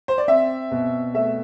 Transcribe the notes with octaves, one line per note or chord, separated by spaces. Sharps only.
C5
D5
C4 E5
B2
A3 E5